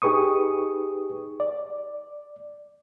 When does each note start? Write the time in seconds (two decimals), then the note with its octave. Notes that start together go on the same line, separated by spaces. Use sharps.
0.02 D#4 G4 G#4 B4 C#6 D#6
1.40 D5